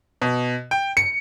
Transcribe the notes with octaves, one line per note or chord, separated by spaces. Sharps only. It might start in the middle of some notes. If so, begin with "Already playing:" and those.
B2
G5
C#7